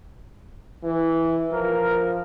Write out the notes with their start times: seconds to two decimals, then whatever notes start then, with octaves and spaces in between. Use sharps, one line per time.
0.84 E3
1.52 F3 A#4